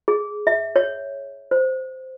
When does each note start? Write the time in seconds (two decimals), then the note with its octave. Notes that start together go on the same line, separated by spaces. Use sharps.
0.08 G#4
0.47 E5
0.76 C#5
1.51 C5